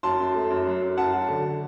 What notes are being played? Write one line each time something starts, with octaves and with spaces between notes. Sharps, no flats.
F#2 A5 C6
F#2
A3
F#2
F#3
F#2
F#2 F#5 A5
F#3
D3